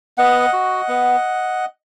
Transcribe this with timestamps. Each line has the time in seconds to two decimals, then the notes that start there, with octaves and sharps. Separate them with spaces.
0.18 B3 D#5 F#5
0.53 F#4
0.88 B3